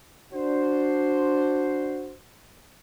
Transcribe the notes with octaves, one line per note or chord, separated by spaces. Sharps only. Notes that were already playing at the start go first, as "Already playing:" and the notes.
D4 F#4 C5